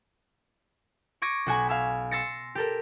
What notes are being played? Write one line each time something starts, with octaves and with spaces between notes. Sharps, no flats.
C#6 D6 G#6 A#6 D#7
B1 F#4 G#5 B5
F5 G#5 E6
C6 E6 A6 A#6 C#7
G4 A4 A#4